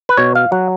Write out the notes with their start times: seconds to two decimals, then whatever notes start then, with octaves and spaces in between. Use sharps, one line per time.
0.09 B4
0.17 B2 C#5
0.35 F5
0.52 F#3 F#5